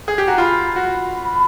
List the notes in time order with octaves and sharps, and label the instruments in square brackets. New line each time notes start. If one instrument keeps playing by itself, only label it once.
[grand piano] G#4
G4
[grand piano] F#4 [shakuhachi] A#5
[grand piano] F4 [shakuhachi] B5
[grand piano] F#4